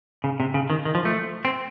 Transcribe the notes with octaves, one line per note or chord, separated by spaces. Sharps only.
C#3
C3
C#3
D#3
D#3
F3
A3
C4